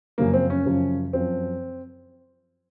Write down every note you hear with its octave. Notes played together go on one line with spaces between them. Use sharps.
F#2 C#3 F3 A#3
C4
C#4
F#2 C#3 F3
F#2 F3 C4